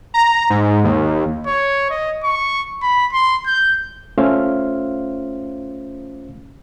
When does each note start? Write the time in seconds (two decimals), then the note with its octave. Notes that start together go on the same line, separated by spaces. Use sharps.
0.14 A#5
0.50 G#2
0.84 D#2
1.47 C#5
1.90 D#5
2.24 C#6
2.82 B5
3.13 C6
3.47 G6
4.18 A3 C#4 F4 C5 E5 F5